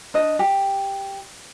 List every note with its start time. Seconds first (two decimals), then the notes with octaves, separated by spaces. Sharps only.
0.14 D4 D#5
0.39 G4